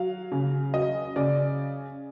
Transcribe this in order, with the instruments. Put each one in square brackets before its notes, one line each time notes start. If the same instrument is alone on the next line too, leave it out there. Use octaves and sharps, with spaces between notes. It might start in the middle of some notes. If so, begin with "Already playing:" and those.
Already playing: [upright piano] F#3 F5
C#3
F#3 D#5
C#3 D5